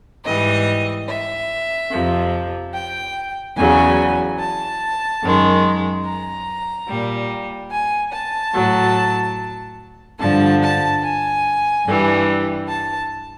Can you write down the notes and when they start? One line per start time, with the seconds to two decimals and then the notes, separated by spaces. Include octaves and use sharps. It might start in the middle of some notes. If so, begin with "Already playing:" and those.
0.24 G#2 E3 G3 D#5
1.07 E5
1.90 F2 C3 F3
2.73 G5
3.56 E2 C#3 F#3 G#5
4.39 A5
5.22 F#2 D#3 G#3
6.04 A#5
6.87 A#2 G3
7.71 G#5
8.12 A5
8.53 A2 F#3
10.19 G2 D3 F3 A5
10.60 A5
11.02 G#5
11.84 G2 E3 G3
12.68 A5